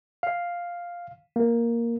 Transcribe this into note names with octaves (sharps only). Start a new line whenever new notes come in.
F5
A#3